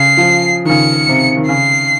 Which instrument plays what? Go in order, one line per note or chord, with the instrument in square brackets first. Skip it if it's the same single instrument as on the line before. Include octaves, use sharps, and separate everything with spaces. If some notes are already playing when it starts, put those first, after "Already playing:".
Already playing: [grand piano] C#3 [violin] C7
[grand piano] F3
D#3
[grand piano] C#3 [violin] C#7
[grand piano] C3
D#3
[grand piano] C#3 [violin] C7